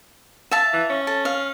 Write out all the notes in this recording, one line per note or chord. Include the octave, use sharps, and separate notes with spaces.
E5 F5 A5
E3
C#4
A4
F5